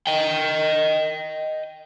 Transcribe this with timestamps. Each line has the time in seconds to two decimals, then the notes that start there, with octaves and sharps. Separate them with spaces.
0.07 D#5 G5